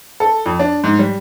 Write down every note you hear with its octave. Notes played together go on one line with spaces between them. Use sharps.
A4
F2
D4
G#2
G3